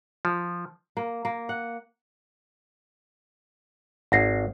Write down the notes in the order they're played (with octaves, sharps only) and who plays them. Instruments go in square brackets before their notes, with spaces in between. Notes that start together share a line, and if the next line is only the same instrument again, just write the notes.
[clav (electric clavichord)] F3
[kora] A#3
A#3
F#5
[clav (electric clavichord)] G#1 [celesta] F#5 A#6 C7